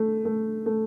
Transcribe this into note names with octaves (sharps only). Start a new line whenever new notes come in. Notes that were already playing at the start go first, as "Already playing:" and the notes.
Already playing: A3
A3
A3